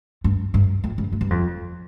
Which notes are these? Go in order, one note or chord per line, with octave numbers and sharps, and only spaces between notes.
G2
G2
F2
G2
F2
G2
F2